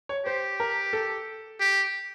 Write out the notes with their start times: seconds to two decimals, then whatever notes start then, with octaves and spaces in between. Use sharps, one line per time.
0.09 C#5
0.26 G4 C5
0.60 A#4
0.93 A4
1.60 G4